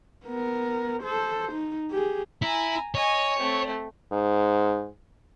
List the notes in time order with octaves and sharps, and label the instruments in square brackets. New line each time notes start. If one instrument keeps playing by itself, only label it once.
[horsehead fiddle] B3 A#4
A4 C5
D#4
G4 G#4
[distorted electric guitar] E4 [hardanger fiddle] G#5 A#5
[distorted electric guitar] C#5 [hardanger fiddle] D#5 G#5
[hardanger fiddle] A3 C4
[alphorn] G#2